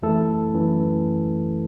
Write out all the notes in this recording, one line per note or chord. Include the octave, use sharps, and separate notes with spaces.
F#2 E3 A3 E4 A4
F#2 E3 A3